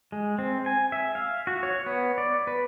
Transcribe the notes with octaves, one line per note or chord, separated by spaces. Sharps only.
G#3
C4
G#5
E5
F5
F#4
C#5
B3
D5
B4